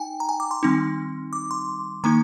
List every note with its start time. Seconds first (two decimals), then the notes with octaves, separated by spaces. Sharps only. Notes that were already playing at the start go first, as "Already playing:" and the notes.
Already playing: D#4 G5 G#5
0.20 A#5
0.29 G#5
0.40 D6
0.51 C6
0.63 D#3 G3 C4 D#4
1.33 D6
1.51 C6
2.04 D#3 A#3 D#4 A#5